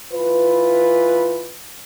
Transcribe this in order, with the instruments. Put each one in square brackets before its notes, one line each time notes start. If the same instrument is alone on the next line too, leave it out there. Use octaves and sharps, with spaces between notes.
[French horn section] E3 F4 B4